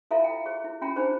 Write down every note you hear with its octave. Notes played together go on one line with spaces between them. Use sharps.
E4 F4 A4 E5 F5 A#5
G5
G#4 C#5
E4
C#4 F4 G5 A#5
D4 D#4 G#4 C5 C#5